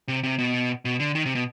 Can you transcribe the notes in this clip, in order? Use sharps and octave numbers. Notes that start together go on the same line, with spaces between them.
C3
C3
B2
B2
D3
D#3
C3
B2